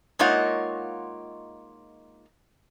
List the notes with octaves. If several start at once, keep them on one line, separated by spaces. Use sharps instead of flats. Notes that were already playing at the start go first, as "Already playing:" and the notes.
G#3 A#3 D#4 F4 C#5 F#5